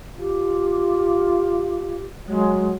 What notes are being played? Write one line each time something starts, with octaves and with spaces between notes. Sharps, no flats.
F4 G4
F#3 G#3